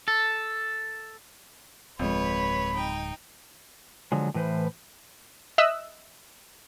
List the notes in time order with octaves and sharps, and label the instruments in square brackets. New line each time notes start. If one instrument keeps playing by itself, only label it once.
[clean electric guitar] A4
[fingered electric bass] D1 G#3 [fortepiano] F2 [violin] B4 C#5 [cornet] B5
[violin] D#4 G5
[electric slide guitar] D3 F3 F#3 G#3
A2 E3 B4 C5
[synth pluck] D#5 E5 D#6 E6 F#6